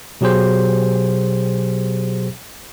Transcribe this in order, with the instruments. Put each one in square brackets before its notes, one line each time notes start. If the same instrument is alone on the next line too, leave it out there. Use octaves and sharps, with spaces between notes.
[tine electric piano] B2 F#3 G4 G#4 C5